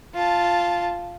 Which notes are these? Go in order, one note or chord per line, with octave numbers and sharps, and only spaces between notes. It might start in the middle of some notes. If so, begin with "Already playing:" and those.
F4 A5